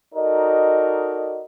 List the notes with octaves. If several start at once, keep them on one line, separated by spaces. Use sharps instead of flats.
D#4 F#4 A4 A#4 D5 D#5